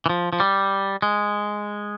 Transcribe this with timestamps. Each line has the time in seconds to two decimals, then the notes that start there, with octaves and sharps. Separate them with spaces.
0.06 E3
0.09 F3
0.33 F3
0.40 G3
1.02 G#3